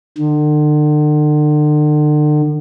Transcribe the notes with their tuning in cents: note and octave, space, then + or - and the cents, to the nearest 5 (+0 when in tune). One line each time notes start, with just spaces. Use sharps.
D3 +40